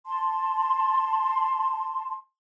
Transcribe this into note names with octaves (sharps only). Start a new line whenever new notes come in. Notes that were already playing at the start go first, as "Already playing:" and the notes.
A5 C6